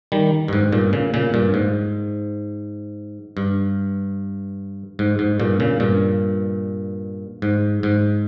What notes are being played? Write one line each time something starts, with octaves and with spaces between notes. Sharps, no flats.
D#3 G3
G2
G#2
G2 A#2
A#2 C#3
A#2 C#3
G2 A#2
G#2
G2
G#2
G#2
G2 A#2
A#2 C#3
G2 A#2
G#2
G#2